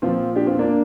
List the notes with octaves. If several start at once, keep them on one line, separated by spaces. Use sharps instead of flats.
A#2 F3 C4 F4
D4 G4
C4 F4
A#3 D4